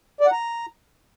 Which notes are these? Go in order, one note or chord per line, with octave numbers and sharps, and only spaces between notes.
D5
F#5
A#5